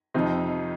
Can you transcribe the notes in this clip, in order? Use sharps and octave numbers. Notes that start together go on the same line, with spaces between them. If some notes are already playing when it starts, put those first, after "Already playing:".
F2 C3 F3 C4 D#4